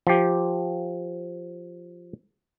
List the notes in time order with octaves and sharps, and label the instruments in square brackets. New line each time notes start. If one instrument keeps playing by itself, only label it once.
[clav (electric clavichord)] F3 G4